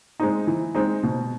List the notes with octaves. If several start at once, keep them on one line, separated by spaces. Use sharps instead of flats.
G#3 C4 D#4
E3
G#3 C4 D#4
B2